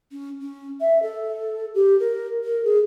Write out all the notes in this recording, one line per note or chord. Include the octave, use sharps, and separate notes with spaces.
C#4
C#4
E5
A4
G4
A#4
A#4
G#4